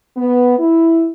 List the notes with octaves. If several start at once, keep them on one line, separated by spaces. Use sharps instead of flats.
B3
E4